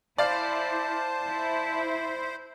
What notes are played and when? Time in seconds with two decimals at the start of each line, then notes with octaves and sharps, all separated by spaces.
0.18 E4 C5 D5 F5 A5
1.27 E4